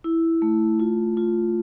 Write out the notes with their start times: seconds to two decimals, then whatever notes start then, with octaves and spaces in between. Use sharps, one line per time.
0.04 E4
0.42 A3
0.80 F4
1.17 F4